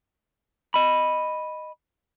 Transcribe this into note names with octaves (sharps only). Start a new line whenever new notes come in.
D#5 B5